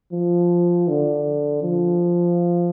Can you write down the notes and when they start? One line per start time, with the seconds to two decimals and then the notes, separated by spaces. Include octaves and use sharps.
0.13 F3
0.88 D3
1.63 F3